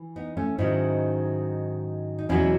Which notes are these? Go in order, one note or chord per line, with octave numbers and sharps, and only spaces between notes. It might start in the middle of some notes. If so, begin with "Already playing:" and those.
Already playing: E3
B3 D#4
A3 C#4
G#2 D#3 F#3 C#4 E4
D#4
E2 B2 F#3 C#4 E4